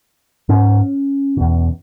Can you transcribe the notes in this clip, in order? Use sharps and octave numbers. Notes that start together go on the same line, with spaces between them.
G#2 C#4
E2 B2